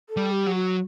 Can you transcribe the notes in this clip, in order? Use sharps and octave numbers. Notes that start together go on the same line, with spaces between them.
A4
G3
G4
F#3
F#4